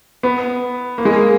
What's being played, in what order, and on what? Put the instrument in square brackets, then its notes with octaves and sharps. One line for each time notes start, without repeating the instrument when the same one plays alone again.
[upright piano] B3
A#3
G#3
A#3